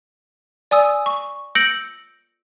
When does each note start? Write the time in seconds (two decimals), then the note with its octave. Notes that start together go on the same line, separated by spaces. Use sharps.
0.71 D5 G#5 D#6 E6
1.06 C#6
1.55 E6 G6 A#6 C#7 D7 F#7